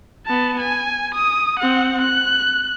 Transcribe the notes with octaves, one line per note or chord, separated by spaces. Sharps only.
B3 A5
G#5
D#6
C4 F#5
F#6